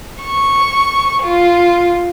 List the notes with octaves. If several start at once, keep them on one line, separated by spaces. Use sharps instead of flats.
C#6
F4